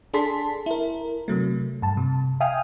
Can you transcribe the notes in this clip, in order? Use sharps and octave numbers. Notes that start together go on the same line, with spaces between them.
D4 G#4 A4 A5 C6 B6
E4 A#4
C3 F#3 A3
G2 A5
C3
E5 F5 G5 G#5 D#6 F6